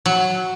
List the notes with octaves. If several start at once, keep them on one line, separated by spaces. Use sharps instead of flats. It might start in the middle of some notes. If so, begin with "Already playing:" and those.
F#3